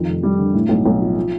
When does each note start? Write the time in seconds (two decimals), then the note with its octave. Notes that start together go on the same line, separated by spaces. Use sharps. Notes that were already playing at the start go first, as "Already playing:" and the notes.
Already playing: F2 D#3
0.08 F1
0.23 G3
0.39 D3
0.54 A2
0.69 B1
0.86 B1
1.01 F3
1.17 F3